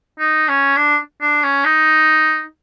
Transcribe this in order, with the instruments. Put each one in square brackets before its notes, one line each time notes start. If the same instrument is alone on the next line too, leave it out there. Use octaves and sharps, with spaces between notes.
[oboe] D#4
C#4
D4
D4
C#4
D#4